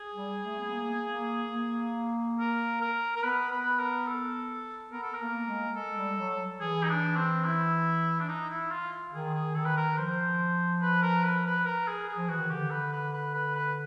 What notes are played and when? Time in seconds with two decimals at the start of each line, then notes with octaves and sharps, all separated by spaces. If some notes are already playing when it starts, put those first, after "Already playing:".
Already playing: G#4
0.14 G3
0.43 A3
0.59 B3
0.70 A#3
1.12 A#3
1.54 A#3
2.39 A#4
2.81 A#4
3.16 A#4
3.23 B3 B4
3.52 B4
3.79 A#4
4.07 A4
4.91 B3 A#4
5.03 A4
5.14 A#4
5.20 A#3
5.47 G#3
5.75 G#3 A4
5.97 G3
6.19 F#3
6.61 E3 G#4
6.83 D#4
6.89 D4
7.16 C4
7.45 E4
8.20 D4
8.29 D#4
8.50 E4
8.72 F4
9.13 D#3 G#4
9.34 G#4
9.55 D#3 A4
9.65 B4
9.77 A#4
9.97 F3 C5
10.82 B4
11.02 A#4
11.23 B4
11.46 B4
11.65 A#4
11.87 G#4
12.09 G#4
12.17 F3
12.29 E3 F#4
12.39 D#3
12.50 D3 G4
12.71 B4
12.93 B4
13.13 B4
13.34 B4
13.55 B4